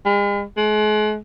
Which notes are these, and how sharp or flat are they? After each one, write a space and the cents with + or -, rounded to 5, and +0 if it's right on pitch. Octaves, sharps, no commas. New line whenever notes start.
G#3 -45
G#3 +40